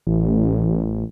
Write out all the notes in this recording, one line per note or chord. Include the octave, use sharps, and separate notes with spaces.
A1